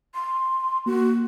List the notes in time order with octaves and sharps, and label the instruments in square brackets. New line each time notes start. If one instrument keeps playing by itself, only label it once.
[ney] C6
[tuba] A#3 [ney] F#4